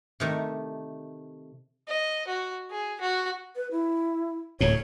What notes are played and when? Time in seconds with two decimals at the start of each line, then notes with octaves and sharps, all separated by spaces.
0.20 C3 D#3 A3
1.88 D#5
2.27 F#4
2.70 G#4
3.01 F#4
3.56 B4
3.71 E4
4.61 D1 A2 C#5